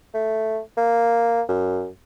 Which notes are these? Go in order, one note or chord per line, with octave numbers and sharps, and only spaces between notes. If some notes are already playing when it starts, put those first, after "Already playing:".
A3
A#3
F#2